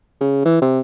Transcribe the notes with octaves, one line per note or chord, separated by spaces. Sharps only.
C#3
E3
C3